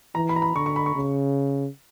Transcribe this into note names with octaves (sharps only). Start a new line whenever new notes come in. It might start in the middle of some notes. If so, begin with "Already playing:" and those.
E3 A#5
B5
A#5
B5
D3 C#6
C#6
B5
C#6
C#3